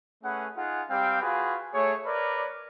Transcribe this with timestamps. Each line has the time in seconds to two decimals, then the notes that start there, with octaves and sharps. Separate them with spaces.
0.23 A3 C#4 G#4 B4 F#5
0.56 D#4 F4 G#4 F#5
0.90 G3 C4 G4 F5 G5
1.22 F4 F#4 G#4 B4 F5
1.73 A3 G#4 C#5
2.05 A#4 B4 C#5 D5